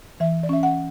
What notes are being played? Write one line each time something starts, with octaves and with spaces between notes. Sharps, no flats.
E3 E5
D5
C#4 E5
F#5